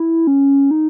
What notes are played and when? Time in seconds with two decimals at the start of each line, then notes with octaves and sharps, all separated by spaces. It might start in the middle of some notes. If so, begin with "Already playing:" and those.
Already playing: E4
0.27 C#4
0.71 D#4